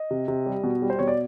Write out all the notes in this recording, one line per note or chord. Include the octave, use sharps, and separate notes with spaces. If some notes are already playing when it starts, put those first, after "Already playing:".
Already playing: D#5
C3
C3
G3
B2
G3
C5
B2 C#5
D5